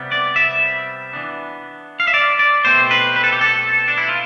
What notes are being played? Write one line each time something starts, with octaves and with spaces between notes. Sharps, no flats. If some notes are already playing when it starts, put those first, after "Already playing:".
Already playing: C3 G3 B3
D5
E5
E3 B3 D4
F5
E5
D5
D5
B2 A3 C4 C5
B4
B4
A4
G4
A4
D4
E4
F4